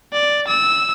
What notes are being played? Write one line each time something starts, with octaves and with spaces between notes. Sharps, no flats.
D5
E6